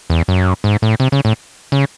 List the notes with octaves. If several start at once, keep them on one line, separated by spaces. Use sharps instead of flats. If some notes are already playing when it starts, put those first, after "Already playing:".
E2
F#2
G#2
A2
C3
C#3
A2
C#3